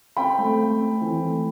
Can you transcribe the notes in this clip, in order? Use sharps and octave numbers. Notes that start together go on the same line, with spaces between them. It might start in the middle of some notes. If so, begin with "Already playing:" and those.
C4 G5 B5
A3
A3
C4
E3
A3